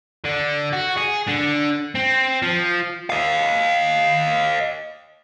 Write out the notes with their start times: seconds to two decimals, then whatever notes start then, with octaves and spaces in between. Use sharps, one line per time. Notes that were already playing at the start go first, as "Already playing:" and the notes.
0.25 D3
0.73 F#4
0.97 G#4
1.28 D3
1.95 C4
2.43 F3
3.10 D#5 F5